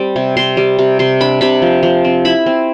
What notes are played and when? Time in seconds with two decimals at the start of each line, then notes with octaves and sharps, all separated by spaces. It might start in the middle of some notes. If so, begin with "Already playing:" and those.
Already playing: G3 C4
0.16 C3
0.37 C3 C6
0.57 G3
0.79 C3
0.99 C3 C6
1.20 D4 B5
1.41 C3 B5
1.62 F3
1.83 F3
2.04 C4
2.25 E4 B5
2.46 C4